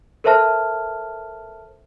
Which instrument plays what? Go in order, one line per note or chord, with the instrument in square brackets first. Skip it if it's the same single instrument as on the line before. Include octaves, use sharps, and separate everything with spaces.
[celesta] A4 A#4 C5 E5 A5 F6